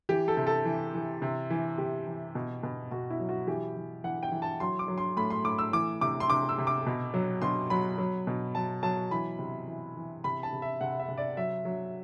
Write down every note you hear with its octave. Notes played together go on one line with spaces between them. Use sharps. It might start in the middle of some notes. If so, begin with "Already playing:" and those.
E3 G4
A4
C3
A4
E3
E3
C3
E3
C3 G4
E3
B2
B2
B2 F#4
E4
F#3
F#4
E3 G4
E3
E3 F#5
G5
E3
A5
F#3 C6
D6
F#3
C6
A2 B5
C6
A2 D6
E6
E3 D6
C3 D6
C6
C3 D6
E6
C3
D6
B2
F#3
B2 C6
F#3 B5
F#3
B2
F#3 A5
F#3 A5
E3 B5
C3
E3
E3
C3 B5
A5
C3
E5
C3 F#5
E5
C3
D5
F#3 E5
F#3